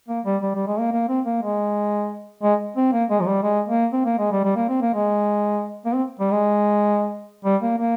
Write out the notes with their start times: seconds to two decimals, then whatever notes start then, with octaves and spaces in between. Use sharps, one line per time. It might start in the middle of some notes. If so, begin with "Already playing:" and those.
0.08 A#3
0.25 G3
0.42 G3
0.55 G3
0.67 G#3
0.79 A#3
0.92 A#3
1.09 C4
1.25 A#3
1.42 G#3
2.43 G#3
2.76 C4
2.92 A#3
3.10 G#3
3.20 F3
3.27 G3
3.43 G#3
3.68 A#3
3.93 C4
4.05 A#3
4.19 G#3
4.31 G3
4.44 G3
4.56 A#3
4.68 C4
4.81 A#3
4.94 G#3
5.86 A#3
5.94 C4
6.19 G3
6.31 G#3
7.45 G3
7.62 A#3
7.78 A#3